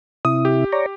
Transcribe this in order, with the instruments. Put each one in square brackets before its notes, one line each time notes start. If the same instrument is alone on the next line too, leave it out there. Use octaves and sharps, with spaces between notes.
[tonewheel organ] C3 E4 [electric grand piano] D#6
[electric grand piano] G4
[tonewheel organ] C#5 D5 A#5